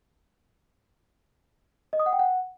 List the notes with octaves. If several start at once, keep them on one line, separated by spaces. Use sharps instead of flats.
D#5
D#6
F#5
G5
F#5